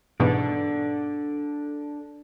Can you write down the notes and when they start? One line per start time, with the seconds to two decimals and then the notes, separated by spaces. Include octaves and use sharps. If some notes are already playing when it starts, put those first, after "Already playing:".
0.20 G#2 B2 E3 D4 A4